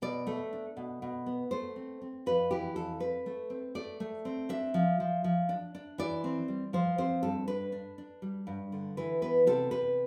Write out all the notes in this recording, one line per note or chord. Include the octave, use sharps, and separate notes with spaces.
B2 D5
A3
D4
B2
B2
B3
A3 C5
C4
C4
F2 B4
E3 G4
F2 A4
C4 B4
A3
C4
A3 D5
A3
C4
D4 E5
F3
F3
F3
D4
D4
E3 D5
C4
G3
F3 C5
C4 C5
G2 A4
D4 B4
D4
D4
G3
G2
D3
E3 B4
B3 B4
C3 A4
C3 B4